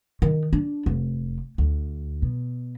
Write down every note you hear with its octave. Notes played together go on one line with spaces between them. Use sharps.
D#3
D4
F1
D2
B2